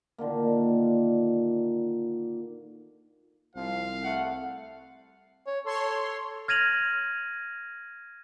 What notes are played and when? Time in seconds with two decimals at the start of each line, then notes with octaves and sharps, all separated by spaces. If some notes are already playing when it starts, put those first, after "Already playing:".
0.18 A#2 D3 D#3 A#3
3.56 C2 F3 F5
4.04 A3 F#5
5.47 C#5
5.66 A4 C#5 C6
6.48 F6 G#6 A#6 D#7 F7 F#7